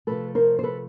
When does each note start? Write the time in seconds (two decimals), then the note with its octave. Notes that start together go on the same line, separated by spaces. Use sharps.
0.07 C3 F3 A3 A4 B4
0.35 A#4 C5
0.59 C5
0.63 A4 B4